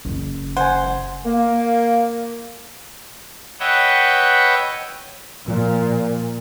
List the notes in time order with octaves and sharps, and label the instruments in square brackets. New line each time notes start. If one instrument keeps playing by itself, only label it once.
[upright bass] F#1
[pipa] C5 [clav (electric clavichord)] F#5 G#5
[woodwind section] A#3
[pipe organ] B4 C#5 D#5 E5 F#5 G5
[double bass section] A#2 [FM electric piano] F3